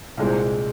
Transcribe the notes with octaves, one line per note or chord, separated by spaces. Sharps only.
C2 A#2 G#3 C4